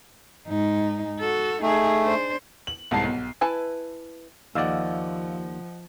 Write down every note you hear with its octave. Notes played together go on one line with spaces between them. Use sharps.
G#2 D#4
F#4 A4
A3 D#4 G#4
D4 C5
F#7
C2 G#2 A5 C7
B1
E4 B4 G#5 A5
D#2 F3 D5 D#5 F5 F#5 E6